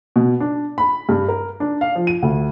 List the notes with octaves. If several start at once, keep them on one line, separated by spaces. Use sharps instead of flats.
B2
D4
B5
G2
A#4
D4
F5
F3
D#7
D2